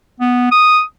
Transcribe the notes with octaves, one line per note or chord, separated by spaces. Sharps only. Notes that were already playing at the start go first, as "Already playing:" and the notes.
B3
D#6